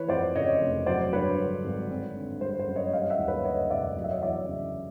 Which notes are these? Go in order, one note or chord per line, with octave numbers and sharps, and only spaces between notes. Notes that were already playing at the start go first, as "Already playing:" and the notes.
Already playing: E3 B4 C#5
F2 C5 D5
C#3 C#5 D#5
F1
F#3 C5 D5
G2 B4 C#5
D3
G#1
C4
D3
G3 C5
C5
F#2
C#5 D#5
G3 D#5 F5
E5 F#5
D#2
B4 C#5
D3 C#5 D#5
F1 D5 E5
F#3 D#5
E5
C#5 D#5
E2 D5 E5
C#3